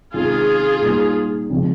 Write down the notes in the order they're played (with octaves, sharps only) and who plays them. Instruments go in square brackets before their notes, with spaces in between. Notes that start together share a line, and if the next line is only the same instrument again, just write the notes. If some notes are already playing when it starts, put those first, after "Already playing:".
[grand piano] C3 D#3 G#3 C#4 [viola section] F4 G#4
[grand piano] A#2 G3 A#3 D#4
C#3 F3 G#3 C4